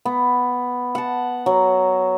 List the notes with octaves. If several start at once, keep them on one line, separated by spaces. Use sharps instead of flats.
B3
F#5 A5
F#3